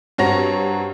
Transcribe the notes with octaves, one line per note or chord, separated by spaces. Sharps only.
G2 C4 F#4 C#5 A#5 A#6